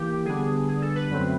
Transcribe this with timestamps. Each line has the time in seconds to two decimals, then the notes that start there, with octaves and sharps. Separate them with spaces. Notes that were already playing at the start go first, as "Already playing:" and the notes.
Already playing: E3 A#3 G4
0.25 D3 G3 B3 D4 G#4
0.68 G#4
0.82 A4
0.95 B4
1.10 F#2 D3 F#3 A3 C4